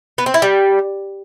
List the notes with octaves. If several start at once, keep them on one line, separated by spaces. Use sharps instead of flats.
B3
C4
E4
G3